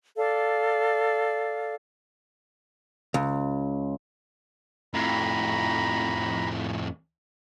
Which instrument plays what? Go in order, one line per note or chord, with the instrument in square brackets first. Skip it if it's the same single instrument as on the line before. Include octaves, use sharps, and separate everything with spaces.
[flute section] A4 D5 F5
[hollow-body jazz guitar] C#2
[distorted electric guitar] F2 A2 [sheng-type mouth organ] A#5 B5